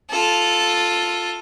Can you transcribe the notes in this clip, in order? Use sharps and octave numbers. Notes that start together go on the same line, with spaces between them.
F4 A4